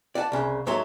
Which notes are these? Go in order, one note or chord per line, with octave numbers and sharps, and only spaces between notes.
D5 F#5 G#5 A5
C2 C#3
G#2 F#3 A3 C#5 C6